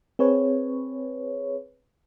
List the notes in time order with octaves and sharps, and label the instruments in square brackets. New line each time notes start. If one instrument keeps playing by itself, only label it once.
[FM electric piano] C4 G#4 B4 C#5